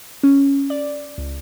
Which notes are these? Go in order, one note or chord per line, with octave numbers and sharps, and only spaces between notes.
C#4
D5
C#2